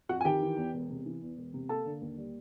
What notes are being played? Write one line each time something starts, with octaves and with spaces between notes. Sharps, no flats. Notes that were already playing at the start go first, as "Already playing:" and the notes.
F2 F#4 F#5
G#5
D#3 G4 G5
E3
E2
E1
C3
E3
E2
E1
C3
A#3 A4 A5
D3
D#2
G3